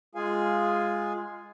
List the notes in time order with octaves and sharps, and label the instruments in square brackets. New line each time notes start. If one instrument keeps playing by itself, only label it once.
[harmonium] G#3 F4 G#4 F5 G#5